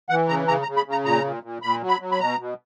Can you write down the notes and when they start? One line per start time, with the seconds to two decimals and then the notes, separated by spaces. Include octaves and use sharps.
0.10 E3 F#5
0.28 C#3 A#5
0.48 C#3 A#5
0.62 A#5
0.67 C#3
0.77 B5
0.86 C#3
0.91 A#5
1.05 A#2 A#5
1.24 A#2
1.43 A#2
1.62 A#2 B5
1.81 F#3
1.88 B5
2.00 F#3
2.12 B5
2.20 B2 A#5
2.39 B2